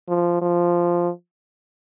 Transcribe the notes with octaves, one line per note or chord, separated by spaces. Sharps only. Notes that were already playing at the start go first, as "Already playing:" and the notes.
F3
F3